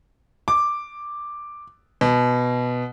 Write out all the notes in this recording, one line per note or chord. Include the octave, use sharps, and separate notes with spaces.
D6
B2